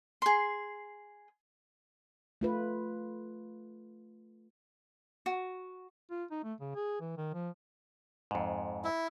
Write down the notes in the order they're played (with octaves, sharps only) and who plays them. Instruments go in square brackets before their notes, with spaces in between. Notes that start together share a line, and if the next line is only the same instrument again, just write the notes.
[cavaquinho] G#4 C6
[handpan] A3 F4 B4
[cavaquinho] F#4
[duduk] F4
D#4
A3
C#3
G#4
E3
D#3
F3
[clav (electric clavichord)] F2 G#2
[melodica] E4